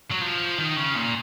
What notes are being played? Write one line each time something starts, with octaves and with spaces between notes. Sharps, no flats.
F#3
F3
D#3
C#3
A#2